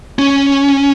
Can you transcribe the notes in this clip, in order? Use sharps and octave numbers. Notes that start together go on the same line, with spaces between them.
C#4